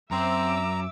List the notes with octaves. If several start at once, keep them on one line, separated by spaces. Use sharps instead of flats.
F#2 C4 E5 A#5 D6 E6